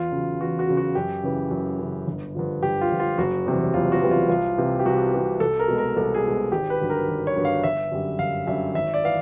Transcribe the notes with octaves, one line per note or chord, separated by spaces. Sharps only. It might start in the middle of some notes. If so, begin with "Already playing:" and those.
Already playing: E2 F4
C#3 F#3
E2 F#4
F#4
C#3 F#3
F#4
F#2 G4
C#3 E3
F#2
C#3 E3
G1
G2 D3 F3
G1 G4
F4
G2 D3 F3
F4
F#1 F#4
E2 C3 E3 G3
F#1 F4
F#4
E2 C3 E3 G3
F4
C2 F4
C3 E3
G4
C2 F#4
C3 E3
C2 A4
A#4
B2 G#3
A#4
C2 A4
G#4
B2 G#3
G#1 G4
B4
G2 D3 F#3
A#4
G#1
C#5
G2 D3 F#3
F5
G1 E5
F#2 D3 G3
G1 F5
F#2 D3 G3 E5
G#1 E5
D5
E3 F5